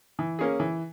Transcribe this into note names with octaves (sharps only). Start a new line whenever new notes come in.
E3
A#3 C#4 G#4
E3